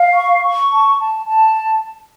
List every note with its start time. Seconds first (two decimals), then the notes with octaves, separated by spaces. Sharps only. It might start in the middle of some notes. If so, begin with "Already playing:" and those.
Already playing: F5
0.13 C#6
0.42 C#6
0.70 A5
0.98 A5
1.26 A5